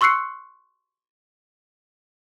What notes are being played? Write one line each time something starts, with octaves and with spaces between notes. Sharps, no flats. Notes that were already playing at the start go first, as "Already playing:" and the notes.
C6 C#6 E6 F#6 C7 C#7